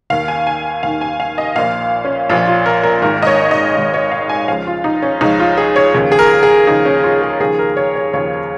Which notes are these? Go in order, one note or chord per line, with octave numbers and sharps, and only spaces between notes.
D#2 D#3 F5
G#5
G#5
D#2 D#3 F5
G#5
F5
D#5
A#1 A#2 F3 F5
C#4
A#1 A#2 F3 F4
F4
A#4
A#4
G#1 G#2 D#3 A#4
D#5
C#5
D#5
G#1 G#2 D#3
C#5
F5
G#5
C#2 C#3 F3 F5
F4
D#4
C#4
C#2 C#3 F3 D#4
F4
G#4
C#5
D#2 C#3 F3
G#4
A#4
G#4
D#2 C#3 F3 D#4
C#4
F4
G#4
D#2 C#3 F3 G#4
A#4
C#5
C#5
D#2 C#3 F3 C#5